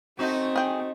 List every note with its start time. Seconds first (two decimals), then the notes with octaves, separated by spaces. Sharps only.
0.19 A3 C4 D#4 F#4
0.56 G#4 G5